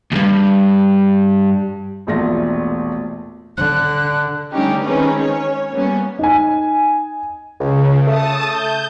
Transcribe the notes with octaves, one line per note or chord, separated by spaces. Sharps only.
D2 G2
E1 A#1 A3 F4 A#6
D3 F#6
D3 G3 A3 C#4 D#4 G4
D#3 G#3 C4 C#4 D#4 B4
C#4 C#5
G3 A#3 B3 C#4
D#4 G#5
C#2 C#3
A3 A5 D#6
G6